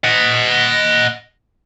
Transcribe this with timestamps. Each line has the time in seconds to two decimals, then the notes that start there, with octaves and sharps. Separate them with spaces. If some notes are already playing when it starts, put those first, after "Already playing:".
0.04 D#5 F#5